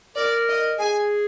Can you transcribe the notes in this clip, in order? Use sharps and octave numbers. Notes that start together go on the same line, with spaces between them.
A#4 D5
D#5
G#4 G#5